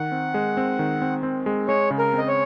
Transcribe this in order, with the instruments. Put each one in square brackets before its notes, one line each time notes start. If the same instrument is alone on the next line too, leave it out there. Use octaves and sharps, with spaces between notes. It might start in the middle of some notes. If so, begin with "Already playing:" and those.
Already playing: [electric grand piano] D#3 [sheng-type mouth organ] F#5
[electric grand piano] C4
G#3
C4
D#3
C4
C4
G#3
[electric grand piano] G#3 [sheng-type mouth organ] C#5
[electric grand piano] C#3
[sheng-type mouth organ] A#4
[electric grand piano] C4 [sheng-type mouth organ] D#5
[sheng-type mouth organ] C#5